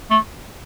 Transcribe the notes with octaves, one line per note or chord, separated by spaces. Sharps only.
A3